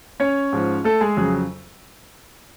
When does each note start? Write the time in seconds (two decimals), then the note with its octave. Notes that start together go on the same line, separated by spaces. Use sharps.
0.20 C#4 C#5
0.53 G#2 F3
0.84 A3 A4
1.01 G#3 G#4
1.17 F2 C#3 F#3 G#4